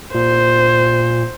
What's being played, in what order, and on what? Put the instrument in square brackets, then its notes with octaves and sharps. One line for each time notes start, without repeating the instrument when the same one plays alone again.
[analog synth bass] A#2 [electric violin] C5